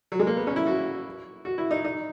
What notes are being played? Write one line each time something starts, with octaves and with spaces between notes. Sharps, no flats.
F#3
G#3
A#3
B3
C#4
E4
F#4
F#4
E4
D#4
D#4